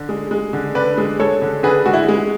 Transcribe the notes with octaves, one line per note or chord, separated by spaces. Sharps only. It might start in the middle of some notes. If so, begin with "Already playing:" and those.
Already playing: D3
G#3
G#3
D3
D3 B4 D5
G#3
G#3 A4 C#5
D3
D3 G#4 B4
G#3 F#4
E4
G#3